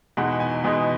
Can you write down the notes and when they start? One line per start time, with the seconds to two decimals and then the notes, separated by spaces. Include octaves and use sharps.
0.17 E2 B2 G#3 D#4 F#5
0.40 G#5
0.64 E2 B2 G#3 D#4